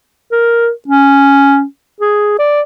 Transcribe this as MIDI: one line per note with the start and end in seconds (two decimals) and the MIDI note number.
0.32 0.70 70
0.88 1.63 61
2.01 2.36 68
2.39 2.62 74